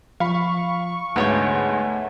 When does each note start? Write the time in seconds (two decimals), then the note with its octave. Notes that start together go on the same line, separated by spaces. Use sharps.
0.20 F3 F5 B5 C#6
1.16 D2 G#2 A3 B3 C#5 G5 G#5